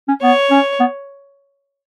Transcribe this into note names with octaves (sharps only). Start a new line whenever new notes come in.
C#4
B3 C#5
C#4
B3